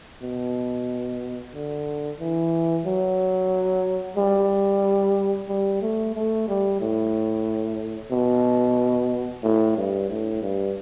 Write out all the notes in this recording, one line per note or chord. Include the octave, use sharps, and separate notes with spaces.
B2
D3
E3
F#3
G3
G3
A3
A3
G3
A2
B2
A2
G2
A2
G2